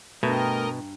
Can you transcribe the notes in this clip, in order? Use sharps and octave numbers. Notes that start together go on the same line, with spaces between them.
G2 B2 A3 A#4 D#5 G#5 A#5